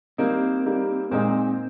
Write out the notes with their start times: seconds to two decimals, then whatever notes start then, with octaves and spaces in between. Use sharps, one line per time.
0.18 G3 A#3 C4 D#4
0.66 G3 A#3 D#4
1.11 A#2 G#3 C4 D#4